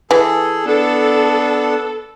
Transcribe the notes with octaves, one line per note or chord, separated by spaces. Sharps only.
E3 G#4 A4
B3 D4 A4